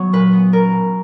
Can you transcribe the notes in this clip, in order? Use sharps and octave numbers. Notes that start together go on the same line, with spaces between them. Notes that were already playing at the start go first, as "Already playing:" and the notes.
Already playing: F#3 B3 C#5
A#2 B4
B3
C#4 A#4
B2